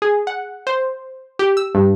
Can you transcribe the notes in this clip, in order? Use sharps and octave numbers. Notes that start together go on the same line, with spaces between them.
G#4
F#5
C5
G4
E6
G2